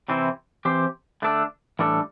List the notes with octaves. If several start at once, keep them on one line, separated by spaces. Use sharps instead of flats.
C3 E3 C4 E4
E3 C4 G4 C5
D3 A3 D4 A4
A2 E3 G3 D4 A4